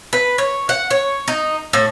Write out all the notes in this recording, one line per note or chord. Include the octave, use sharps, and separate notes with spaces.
B4
C#5
F#5
C#5
D#4
A2